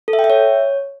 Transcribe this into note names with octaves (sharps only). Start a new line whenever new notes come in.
A4
E5
G5
E5
C#5